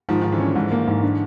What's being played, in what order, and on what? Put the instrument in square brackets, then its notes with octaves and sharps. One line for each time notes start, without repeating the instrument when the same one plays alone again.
[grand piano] G#2 [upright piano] D#3 F3
[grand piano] G#2 [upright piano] D#3
[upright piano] D3 E3
[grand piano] C#4
G#2
A#3
G#2
D4